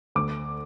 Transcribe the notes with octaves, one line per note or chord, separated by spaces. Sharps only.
D2 D6